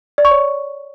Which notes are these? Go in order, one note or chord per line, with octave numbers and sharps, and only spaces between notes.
D5
C#6
C#5